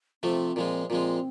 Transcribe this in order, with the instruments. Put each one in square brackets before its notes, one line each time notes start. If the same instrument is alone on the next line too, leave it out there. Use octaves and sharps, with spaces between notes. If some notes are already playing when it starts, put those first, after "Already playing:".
[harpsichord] C3 F3 A3 [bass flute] C4
[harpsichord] A#2 F3 G#3
[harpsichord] A#2 F3 G#3 [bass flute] C4